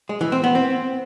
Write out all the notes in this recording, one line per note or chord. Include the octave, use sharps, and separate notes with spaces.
G#3
E3
C4
B3
C4